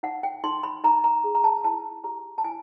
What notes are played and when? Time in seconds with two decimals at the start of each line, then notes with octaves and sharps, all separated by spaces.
0.03 D#4 F#5
0.23 G5
0.44 D#4 C6
0.63 B5
0.84 D#4 A#5
1.04 A#5
1.24 G#4
1.35 A#5
1.44 A5
1.64 E4 A5
2.04 G4 A#5
2.38 A5
2.44 E4 G#5